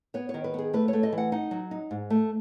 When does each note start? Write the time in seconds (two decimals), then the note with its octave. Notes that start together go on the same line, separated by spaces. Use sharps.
0.14 B3 C#5
0.29 C#5
0.34 D#3
0.44 B4
0.54 B3 G#4
0.73 A3 B4
0.88 C#5
0.93 A3
1.03 D#5
1.13 E3
1.18 F#5
1.32 D#4 F#5
1.51 F#3
1.71 D#4
1.91 G#2
2.10 A3